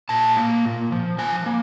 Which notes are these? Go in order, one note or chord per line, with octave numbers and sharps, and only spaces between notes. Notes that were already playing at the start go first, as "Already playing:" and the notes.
A#2 A5
A#3
A#2
F3
F3 G#5
A#3